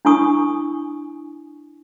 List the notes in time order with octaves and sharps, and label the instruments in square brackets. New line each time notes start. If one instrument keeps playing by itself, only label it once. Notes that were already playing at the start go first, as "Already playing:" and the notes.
[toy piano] D4 E4 G#5 C#6 D#6